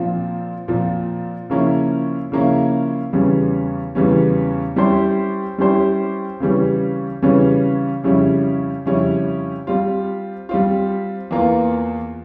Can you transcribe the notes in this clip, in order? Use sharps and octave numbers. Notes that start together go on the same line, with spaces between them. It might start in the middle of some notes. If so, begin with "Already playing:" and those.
Already playing: A#2 F3 C4
A#2 F3 C4
C#3 F3 A#3 C#4 E4
C#3 F3 A#3 C#4 E4
E2 C#3 E3 G3 C#4
E2 C#3 E3 G3 C#4
G3 C#4 E4 G4 C5
G3 C#4 E4 G4 C5
C#3 E3 G3 C#4
C#3 E3 G3 C#4
F2 C#3 G3 C#4 E4
F2 C#3 G3 C#4 E4
G3 C4 F4
G3 C4 F4
E2 E3 A#3 F4